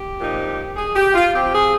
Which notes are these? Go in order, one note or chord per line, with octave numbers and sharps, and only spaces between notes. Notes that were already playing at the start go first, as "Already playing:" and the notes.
Already playing: G4
A#2 F3 C4 D#4
G#4
G4
F4
F3 C4 F4 G4
G#4